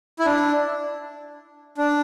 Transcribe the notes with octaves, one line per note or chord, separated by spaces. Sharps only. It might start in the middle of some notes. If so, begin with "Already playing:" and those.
E4
D4
D4